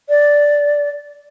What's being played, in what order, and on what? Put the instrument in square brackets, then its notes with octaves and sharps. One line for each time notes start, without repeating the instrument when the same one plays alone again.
[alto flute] D5